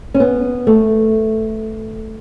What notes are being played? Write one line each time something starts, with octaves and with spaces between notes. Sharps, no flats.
C#4
B3
A3